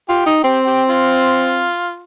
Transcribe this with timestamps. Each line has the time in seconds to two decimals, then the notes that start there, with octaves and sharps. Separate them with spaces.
0.09 F4 G4
0.26 D#4
0.43 C4 G4
0.66 G4
0.90 F4